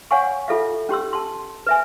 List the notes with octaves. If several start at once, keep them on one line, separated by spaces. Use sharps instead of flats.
C#5 F5 F#5 G#5 C#6
F4 A4 E5 F5
C#4 G4 C6 E6
A5 C6
B4 E5 G#5